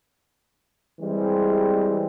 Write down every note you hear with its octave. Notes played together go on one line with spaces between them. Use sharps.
E3 G3 G#3 C4